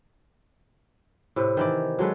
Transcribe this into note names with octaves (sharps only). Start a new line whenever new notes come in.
A2 C3 B4
D#3 E3 D5
F#3 G#3 A4 B4